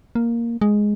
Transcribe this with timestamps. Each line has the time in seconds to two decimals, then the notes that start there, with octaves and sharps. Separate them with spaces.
0.15 A#3
0.61 G#3